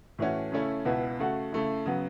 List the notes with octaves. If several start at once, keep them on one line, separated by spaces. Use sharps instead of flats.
A2 E3 A3 C#4 F#4
C#3 A3 C#4 E4
C#2 B2 B3 E4
C#3 A3 F#4
C#3 A3 E4
C#3 F#3 B3